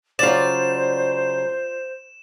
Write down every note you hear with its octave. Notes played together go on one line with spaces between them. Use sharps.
C#3 F#3 F4 C5 D5 E7